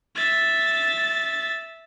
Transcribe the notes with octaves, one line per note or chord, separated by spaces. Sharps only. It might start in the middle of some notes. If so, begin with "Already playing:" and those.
E5 A6